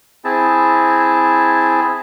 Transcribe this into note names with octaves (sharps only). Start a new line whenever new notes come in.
C4 E4 G#4 A5